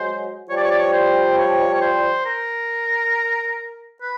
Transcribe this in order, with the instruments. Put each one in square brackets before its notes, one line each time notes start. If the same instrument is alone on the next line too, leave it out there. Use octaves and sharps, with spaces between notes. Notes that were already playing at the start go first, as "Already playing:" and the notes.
Already playing: [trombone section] F#3 G#3 [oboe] C5
[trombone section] F3 G3 [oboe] C#5
[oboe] D5
C#5
D5
C#5
C5
C#5
C#5
C5
A#4
B4